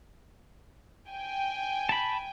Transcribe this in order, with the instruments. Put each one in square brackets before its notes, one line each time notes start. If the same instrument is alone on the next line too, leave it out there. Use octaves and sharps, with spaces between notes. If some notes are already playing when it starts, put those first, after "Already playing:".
[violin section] G5 G#5
[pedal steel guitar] A5 B5